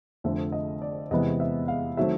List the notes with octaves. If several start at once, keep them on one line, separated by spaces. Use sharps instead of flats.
F1 F2 D3 E5
D#5
D5
E2 C3 E3 G#3 B3 D#5
E5
F5
D#3 F#3 A3 C4 E5